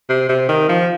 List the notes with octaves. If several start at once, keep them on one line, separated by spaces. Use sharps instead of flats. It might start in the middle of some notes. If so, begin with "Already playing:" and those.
C3
C3
D#3
F3